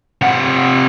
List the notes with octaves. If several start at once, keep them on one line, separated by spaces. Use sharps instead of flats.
C3 F#5